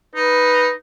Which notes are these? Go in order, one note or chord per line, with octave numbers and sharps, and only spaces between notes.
D#4 B4